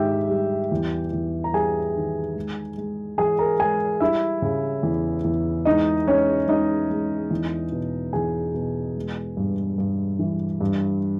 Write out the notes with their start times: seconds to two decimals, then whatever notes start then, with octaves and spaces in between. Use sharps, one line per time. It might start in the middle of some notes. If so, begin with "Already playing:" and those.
Already playing: G#2 D#3 G4 E5 G5
0.29 G3
0.72 E2
1.13 E2
1.44 A#5
1.53 G3 G#4 G#5
1.95 D#3
2.35 G#3
2.78 G#3
3.18 E3 G#4 G#5
3.39 A#4 A#5
3.59 G#3 G#4 G#5
4.00 G3 E4 E5
4.42 C#3
4.83 E2
5.24 E2
5.65 G#3 D#4 D#5
6.07 G#3 C#4 C#5
6.48 G#3 D#4 D#5
6.90 G#3
7.31 E2
7.72 B2
8.13 E2 G#4 G#5
8.54 B2
8.97 G#3
9.37 G2
9.78 G2
10.19 E3
10.61 G2